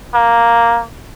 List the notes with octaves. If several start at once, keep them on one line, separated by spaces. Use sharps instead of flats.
A#3